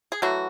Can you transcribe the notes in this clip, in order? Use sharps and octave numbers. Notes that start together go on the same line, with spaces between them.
G#4
E3 F#3 A3 F#4